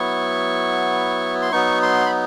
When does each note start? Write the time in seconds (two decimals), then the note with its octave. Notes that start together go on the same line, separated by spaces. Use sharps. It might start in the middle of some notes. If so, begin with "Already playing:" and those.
Already playing: F#3 B3 E4 C#6
1.42 C6
1.52 F#3 B3 D#4 C#6
1.82 C6
2.06 B5